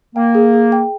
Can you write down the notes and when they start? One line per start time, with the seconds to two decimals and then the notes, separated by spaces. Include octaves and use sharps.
0.15 A#3 G5
0.35 G#4
0.53 G#4
0.72 G5